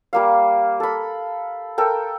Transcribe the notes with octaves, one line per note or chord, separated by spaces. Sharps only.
G3 A#3 F5
A4 B5
A4 A#4 G5